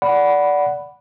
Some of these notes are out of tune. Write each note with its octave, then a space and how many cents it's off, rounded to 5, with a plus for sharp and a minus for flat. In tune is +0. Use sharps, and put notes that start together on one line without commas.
D5 -15 F#5 +0 B5 +0